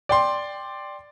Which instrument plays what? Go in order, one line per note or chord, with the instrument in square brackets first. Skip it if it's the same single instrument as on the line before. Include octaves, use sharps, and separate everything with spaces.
[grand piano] D5 G5 C6